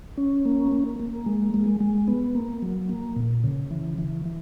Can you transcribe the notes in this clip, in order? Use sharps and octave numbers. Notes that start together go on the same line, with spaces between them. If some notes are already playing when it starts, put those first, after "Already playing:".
C#4
A#3
A#3
A#3
G#3
G#3
G#3
B3
A#3
F#3
A#3
A#2
C#3
E3
E3
E3